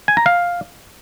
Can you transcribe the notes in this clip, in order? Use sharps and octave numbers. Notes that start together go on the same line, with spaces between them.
G#5
A#5
F5